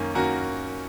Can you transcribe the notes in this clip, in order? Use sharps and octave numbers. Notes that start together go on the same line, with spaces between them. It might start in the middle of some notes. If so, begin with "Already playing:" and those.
Already playing: F#2 D#3 A#3 C#4
F#2 D#3 A#3 C#4 F#4 A#4